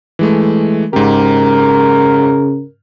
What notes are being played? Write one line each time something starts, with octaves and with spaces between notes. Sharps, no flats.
E3 G#3 A3
G#2 C#3 G4 A#4